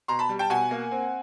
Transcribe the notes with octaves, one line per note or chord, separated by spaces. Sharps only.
B2 A#5 C6
A5 B5
G3
G5 A5
B2 F#5 G#5
A#3
C4